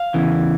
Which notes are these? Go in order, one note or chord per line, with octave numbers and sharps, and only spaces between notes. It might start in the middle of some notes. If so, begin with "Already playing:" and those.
Already playing: F5
E2 C#3 E3